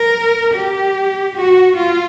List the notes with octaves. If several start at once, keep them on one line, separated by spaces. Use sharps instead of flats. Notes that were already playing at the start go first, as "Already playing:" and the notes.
Already playing: A#4
G4
F#4
F4